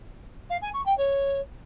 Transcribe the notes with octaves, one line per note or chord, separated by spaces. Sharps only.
F5
G#5
C#6
G5
C#5